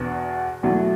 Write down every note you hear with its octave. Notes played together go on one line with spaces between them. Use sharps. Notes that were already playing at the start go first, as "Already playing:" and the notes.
Already playing: E2 B2 B3 D4 F#4
E2 B2 F#3 A3 E4